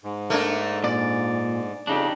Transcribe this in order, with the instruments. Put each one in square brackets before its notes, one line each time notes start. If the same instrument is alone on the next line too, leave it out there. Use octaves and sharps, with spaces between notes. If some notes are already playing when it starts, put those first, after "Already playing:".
[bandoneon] G#2
[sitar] A3 A#3 D4
[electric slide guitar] A#2 [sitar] D5
[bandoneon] F2 C#3 [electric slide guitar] D4 D#4 G4